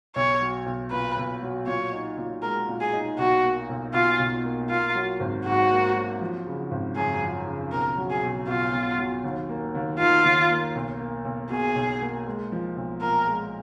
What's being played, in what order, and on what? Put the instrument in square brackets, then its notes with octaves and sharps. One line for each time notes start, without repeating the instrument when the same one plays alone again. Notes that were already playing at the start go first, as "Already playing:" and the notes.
[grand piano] B1 [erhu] C#5
[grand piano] F#3
B1
[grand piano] A#2 [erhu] B4
[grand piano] B1
F#3
[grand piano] A#2 [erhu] C#5
[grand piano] D#4
A#2
[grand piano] G#3 [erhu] A#4
[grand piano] A#2
[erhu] G#4
[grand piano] D#4
[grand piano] B1 [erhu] F#4
[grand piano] A#3
B1
[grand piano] B2 [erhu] F4
[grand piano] B1
A#3
[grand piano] A#3 [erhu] F4
[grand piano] F#3
G#1
[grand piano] G#2 [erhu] F#4
[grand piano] A#3
F#3
F3
C#3
G#1
[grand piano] F#2 [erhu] G#4
[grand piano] F3
C#3
[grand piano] B1 [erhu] A#4
[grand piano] F#3
[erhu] G#4
[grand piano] B1
[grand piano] B2 [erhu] F4
[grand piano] B1
F#3
D#2
A#3
D#2
[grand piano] D#3 [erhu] F4
[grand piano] D#2
A#3
B1
A#3
B1
[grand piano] B2 [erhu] G#4
[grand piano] B1
A#3
G#3
F3
B1
[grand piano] A#2 [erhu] A#4
[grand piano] G#3